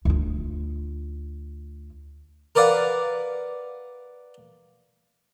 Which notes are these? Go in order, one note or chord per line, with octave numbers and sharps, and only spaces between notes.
D2 F4
A#4 B4 D5 F5 F#5